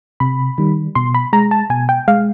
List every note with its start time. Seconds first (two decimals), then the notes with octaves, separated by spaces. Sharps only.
0.20 C3 B5
0.58 D#3 G3
0.95 B2 C6
1.15 B5
1.33 G#3 A#5
1.51 A5
1.70 B2 G#5
1.89 G5
2.08 G#3 F5